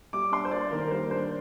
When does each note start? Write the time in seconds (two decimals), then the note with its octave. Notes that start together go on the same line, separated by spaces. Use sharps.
0.13 G3 D6
0.32 D4 C6
0.45 C5
0.51 A#3 D5
0.71 D#3 A#4
0.87 A#4
0.91 G3 C5
1.10 D4 C5